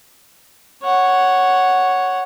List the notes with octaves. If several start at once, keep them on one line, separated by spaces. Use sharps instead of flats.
C#5 F#5